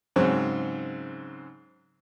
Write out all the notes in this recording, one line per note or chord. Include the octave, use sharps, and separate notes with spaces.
G#2 C#3 F#3 C4